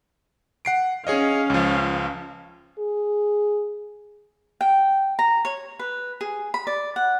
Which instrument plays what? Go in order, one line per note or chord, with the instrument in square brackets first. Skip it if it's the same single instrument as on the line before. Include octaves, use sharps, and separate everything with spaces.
[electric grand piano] F#5 C7 D7
[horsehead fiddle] C#4 F5 [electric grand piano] G#4 C#5 D#5
[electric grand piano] C#2 F3
[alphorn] G#4
[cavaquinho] G5
A#5
C#5
B4
G#4
B5
D5
F#5